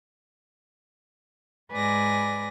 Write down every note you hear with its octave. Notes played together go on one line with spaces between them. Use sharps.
G#2 B4 D5 G#5 A#6